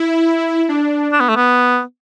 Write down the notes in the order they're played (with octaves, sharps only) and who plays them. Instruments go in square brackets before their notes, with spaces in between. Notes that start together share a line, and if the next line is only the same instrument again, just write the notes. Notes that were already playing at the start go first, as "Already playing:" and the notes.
Already playing: [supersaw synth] E4
D4
[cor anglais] D4
B3
A3
B3